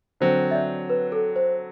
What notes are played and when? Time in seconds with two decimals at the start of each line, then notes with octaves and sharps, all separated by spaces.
0.20 D3 F#3 C4 C5
0.51 E5
0.55 D5
0.90 B4
1.12 A4
1.36 C5